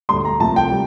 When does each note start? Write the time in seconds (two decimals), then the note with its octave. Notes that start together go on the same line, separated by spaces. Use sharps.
0.09 D2 D3 G3 C6
0.25 A#5
0.40 C2 C3 F3 A3 A5
0.56 G5
0.71 G3